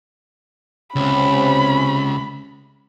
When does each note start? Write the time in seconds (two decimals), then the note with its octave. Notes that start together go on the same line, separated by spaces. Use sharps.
0.96 C#2 C3 C4 C#4 B5